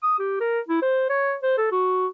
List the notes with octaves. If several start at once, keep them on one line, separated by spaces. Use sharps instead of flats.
D#6
G4
A#4
E4
C5
C#5
C5
A4
F#4